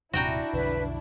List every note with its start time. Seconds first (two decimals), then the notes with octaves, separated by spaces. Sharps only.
0.14 D#1 G#2 C3 D4 E4 F#4 G5 A#5
0.53 B1 F2 D3 B4